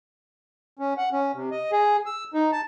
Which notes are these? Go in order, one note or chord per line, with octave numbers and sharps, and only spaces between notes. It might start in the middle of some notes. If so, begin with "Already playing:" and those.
C#4
F#5
C#4
C3
D#5
G#4
E6
D#4
A5